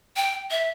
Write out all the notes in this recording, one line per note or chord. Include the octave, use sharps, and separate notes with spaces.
G5
E5